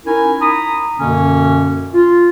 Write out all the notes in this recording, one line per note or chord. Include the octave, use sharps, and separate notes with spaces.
C#4 D#4 E4 A#4 G#5
A#5 B5 D#6
F#2 B2 D3 A#3 C#4
F4